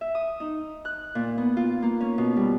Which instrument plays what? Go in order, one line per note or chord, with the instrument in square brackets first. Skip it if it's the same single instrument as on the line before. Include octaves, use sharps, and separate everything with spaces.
[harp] E5
D#6
D#4
F#6
A#2
B3
F4
A#3
C#4
B2
G3